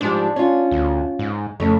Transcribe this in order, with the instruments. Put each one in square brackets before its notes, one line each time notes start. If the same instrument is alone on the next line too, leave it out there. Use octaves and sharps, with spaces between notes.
[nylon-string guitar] G#2 F3 G3 [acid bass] D4
[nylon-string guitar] C#4 F4
[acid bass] D2
G#2
[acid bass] F2 [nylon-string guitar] C#3 A3